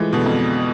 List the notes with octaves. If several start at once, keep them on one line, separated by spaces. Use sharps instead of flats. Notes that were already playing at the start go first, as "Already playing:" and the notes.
Already playing: E3 F3 G#3 A3
B2 D3
F2